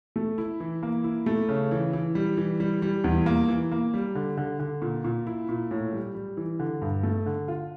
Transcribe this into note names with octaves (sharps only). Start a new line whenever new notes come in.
A3
E4
E3
A#3
E4
A3
C#3
E3
E3
G3
E3
G3
G3
E2
A#3
E3
A#3
G3
D3
D3
D3
A#2
A#2
E4
A#2
A2
G3
G3
E3
D3
G2
A3
D3
F4